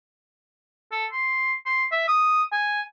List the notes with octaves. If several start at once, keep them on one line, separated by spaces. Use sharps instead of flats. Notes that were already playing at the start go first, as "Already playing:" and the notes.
A4
C6
C6
E5
D#6
G#5